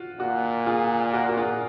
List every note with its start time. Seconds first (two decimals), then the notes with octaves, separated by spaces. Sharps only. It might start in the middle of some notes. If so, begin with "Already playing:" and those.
Already playing: F4 F#4
0.19 A#2 F#4
0.66 F4 G#4
1.13 F#4 A#4
1.29 F#4
1.37 F4 G#4